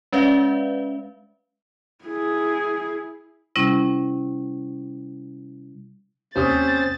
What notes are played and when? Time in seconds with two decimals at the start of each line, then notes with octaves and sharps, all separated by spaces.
0.13 G#3 C#4 B4 D5 E5 F5
2.05 E4 G#4
3.56 C3 G3 C#4 E4
6.36 D#2 C3 C#4 C5 D#6 A6